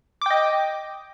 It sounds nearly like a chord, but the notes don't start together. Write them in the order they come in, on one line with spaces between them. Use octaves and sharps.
D6 G5 D#5